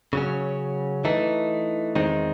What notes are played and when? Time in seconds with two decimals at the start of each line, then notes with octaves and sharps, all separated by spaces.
0.13 C#3 F#3 C#4
1.05 E3 A3 D#4
1.95 E2 D#3 G#3 C4 D#4